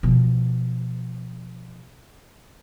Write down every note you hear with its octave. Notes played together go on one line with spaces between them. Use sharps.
B2 F3